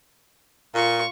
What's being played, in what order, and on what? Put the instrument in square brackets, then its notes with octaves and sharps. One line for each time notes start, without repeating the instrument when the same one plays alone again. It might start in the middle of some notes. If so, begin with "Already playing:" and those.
[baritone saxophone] A#2 [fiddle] F4 C#6